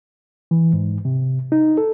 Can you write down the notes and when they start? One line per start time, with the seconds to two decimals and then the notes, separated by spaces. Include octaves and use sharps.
0.51 E3
0.73 G#2
1.05 C3
1.52 D#4
1.78 A4